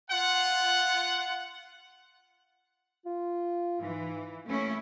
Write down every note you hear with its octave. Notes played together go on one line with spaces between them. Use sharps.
F4 F#5
F4
G#2 E3
A3 A#3 C#4 E4